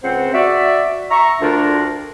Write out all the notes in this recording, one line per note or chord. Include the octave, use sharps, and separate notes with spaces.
C#2 C4 C5 F#5
F#4 D5 E5
E5 A#5 C#6
D2 D4 F4 A#4